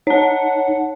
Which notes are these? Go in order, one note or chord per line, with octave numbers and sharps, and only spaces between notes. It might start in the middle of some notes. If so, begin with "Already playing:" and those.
D#4 C#5 F#5 A5